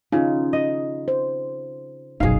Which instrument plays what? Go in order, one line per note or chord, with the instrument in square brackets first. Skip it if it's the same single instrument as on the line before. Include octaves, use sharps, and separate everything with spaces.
[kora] C#3 [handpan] D#4 F4
[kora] D#5
[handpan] C5
[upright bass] F#1 B1 [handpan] D#4 [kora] G#4 F5